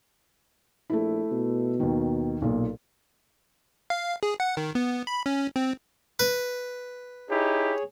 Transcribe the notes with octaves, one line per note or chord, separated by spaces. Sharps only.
A#1 A3 E4
B2
D#2 D#3
B1 A#2
F5
G#4
F#5
D#3
B3
B5
C#4
C4
B4
D#4 E4 G4 G#4 C#5